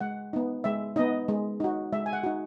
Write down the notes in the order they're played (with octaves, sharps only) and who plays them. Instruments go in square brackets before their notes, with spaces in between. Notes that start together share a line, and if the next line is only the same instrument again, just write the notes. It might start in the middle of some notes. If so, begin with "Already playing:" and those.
[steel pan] G#3 F#5
B3 D#4
G#3 E5
B3 D#4 D#5
G#3
D#4 F#4
G#3 E5
G#5
F#5
D#4 F#4